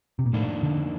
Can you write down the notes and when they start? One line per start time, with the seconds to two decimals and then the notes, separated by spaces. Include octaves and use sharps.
0.19 C3
0.26 A#2
0.33 F2 A2 D#3 A#3 D4
0.63 D3